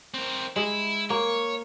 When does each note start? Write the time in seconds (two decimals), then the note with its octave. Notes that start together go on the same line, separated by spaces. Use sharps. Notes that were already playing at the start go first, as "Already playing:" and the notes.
0.14 C4 A#4
0.56 G#3 E4
1.10 A#3 C#5